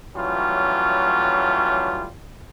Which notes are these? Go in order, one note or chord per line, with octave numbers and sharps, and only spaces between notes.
E3 F#3 G3 A3 C#4 F4